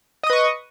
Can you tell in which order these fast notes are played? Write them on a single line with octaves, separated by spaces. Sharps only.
D#5 D#6 B4 C#6